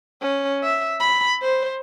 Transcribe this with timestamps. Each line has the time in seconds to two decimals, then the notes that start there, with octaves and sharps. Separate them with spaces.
0.22 C#4
0.63 E5
1.00 B5
1.42 C5